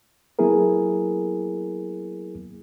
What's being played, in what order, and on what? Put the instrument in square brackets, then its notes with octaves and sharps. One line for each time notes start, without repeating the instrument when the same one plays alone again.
[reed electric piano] F#3 A#3 B3 E4 G#4 A#4